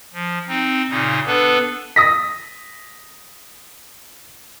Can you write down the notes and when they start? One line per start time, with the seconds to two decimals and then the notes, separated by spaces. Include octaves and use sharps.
0.13 F3
0.48 C4 D#4
0.90 A#2 C#3 D#4
1.26 B3 D4 A4 B4
1.96 D#6 A#6 B6